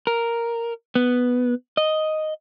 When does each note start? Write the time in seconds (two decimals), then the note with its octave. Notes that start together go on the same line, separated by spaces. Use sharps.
0.07 A#4
0.95 B3
1.77 D#5